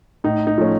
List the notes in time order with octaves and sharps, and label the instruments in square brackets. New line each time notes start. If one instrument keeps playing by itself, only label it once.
[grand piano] A2 D#4
D#4
F3 A3 C#4